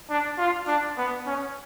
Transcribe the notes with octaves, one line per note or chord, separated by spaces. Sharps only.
D4
F4
D4
B3
C#4